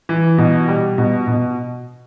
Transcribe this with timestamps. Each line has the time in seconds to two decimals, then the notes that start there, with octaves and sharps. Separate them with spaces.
0.09 E3
0.38 B2
0.68 G3
0.98 B2
1.28 B2